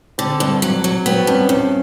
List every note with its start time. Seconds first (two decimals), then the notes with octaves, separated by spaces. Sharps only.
0.18 D3 C4
0.40 G2
0.62 F#3
0.84 F#3
1.06 B3 C4
1.27 G2 C#4
1.49 G2 C#4